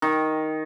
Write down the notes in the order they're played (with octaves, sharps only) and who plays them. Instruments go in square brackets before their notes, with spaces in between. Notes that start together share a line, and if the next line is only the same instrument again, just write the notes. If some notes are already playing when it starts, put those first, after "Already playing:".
[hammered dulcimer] D#3